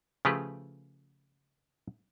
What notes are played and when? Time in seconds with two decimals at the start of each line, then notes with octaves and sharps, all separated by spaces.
0.25 C#3 F3 A3 G4 G#4 B4